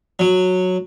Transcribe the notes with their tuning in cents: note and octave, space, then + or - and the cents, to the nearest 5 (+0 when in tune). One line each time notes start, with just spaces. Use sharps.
F#3 -10